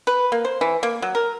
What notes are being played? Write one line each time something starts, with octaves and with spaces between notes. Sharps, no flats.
B4
A#3
C5
E3
A#3
F#3
A#4